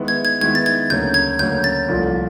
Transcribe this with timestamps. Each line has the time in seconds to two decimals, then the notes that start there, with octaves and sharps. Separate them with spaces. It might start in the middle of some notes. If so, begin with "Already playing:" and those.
Already playing: D#3 G#3 B3 E4
0.08 G#6
0.25 G#6
0.41 D#3 G#3 B3 E4 G#6
0.55 A6
0.66 G#6
0.90 D2 C#3 F#3 A#3 G6
1.14 G#6
1.39 D2 C#3 F#3 A#3 G6
1.64 A6
1.88 C2 A#2 F3 A3